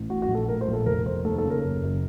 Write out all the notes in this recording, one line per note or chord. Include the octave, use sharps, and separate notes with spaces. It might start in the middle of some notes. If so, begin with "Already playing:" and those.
Already playing: A1
A2 F#4
F#4
A#1
A4
A2 A#4
C5
A#1
A4
F1 A#4
F1 C5
D#2 A4
A4
C#3
A#4
F#1
F#1